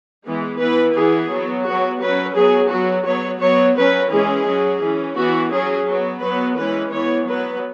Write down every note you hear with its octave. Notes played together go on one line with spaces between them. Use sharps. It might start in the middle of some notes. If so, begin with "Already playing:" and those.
E3 G#3 B3
E3 B3 B4
E3 B3 G#4
F#3 B3
F#3 B3 F#4
F#3 C#4 B4
F#3 B3 G#4
F#3 B3 F#4
F#3 B3 C#5
F#3 B3 C#5
F#3 C#4 B4
E3 G#3 C#4 G#4
F#3 C#4
E3 C#4
E3 B3 F#4
F#3 C#4 G#4
F#3 B3
F#3 B3 B4
E3 G#3 C#4 B4
E3 B3 C#5
F#3 B3 B4